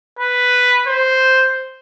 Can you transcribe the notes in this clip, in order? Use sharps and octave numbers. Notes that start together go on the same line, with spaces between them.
B4
C5